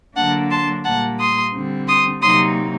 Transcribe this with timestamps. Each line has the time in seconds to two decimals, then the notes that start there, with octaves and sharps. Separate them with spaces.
0.16 D3 F#3 A#3 D4 F#5 A5
0.50 A5 C6
0.84 A#2 G3 A#3 F#5 A5
1.19 C6 D#6
1.54 D3 G3 C4
1.87 C6 D#6
2.22 C3 F#3 A#3 D#4 C6 D#6